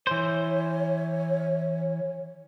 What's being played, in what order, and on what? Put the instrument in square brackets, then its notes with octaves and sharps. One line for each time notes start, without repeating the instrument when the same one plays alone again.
[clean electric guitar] E3 C5 [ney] C#5